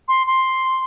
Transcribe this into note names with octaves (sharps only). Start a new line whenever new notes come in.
C6
C6